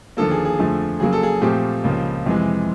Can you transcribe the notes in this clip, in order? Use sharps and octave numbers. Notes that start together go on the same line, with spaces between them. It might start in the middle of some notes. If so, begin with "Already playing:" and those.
D#2 D3 F3 A#3 A4
G#4
G#4
F2 D3 F3 A3
C#3 F#3 A#3 G#4
A4
G#4
A#2 F3 A3 C4 G4
C#2 C#3 F3 A#3
F2 C3 E3 G#3